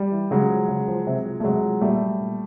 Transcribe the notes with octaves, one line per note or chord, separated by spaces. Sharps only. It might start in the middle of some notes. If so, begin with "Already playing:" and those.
Already playing: G3
E3
C#3 F#3 G#3
F3
C#3
F3
C3
F3
A3
C3 F#3 G#3
F3
A#2 G3 A3
F#3
A#2